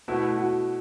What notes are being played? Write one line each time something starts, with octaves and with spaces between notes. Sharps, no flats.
B2 A3 E4 F#4 B4
F#4